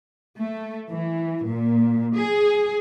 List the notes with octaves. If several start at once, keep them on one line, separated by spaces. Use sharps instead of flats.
A3
E3
A#2
G#4